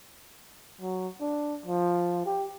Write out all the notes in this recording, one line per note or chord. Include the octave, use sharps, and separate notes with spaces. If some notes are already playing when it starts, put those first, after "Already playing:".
F#3
D4
F3
G4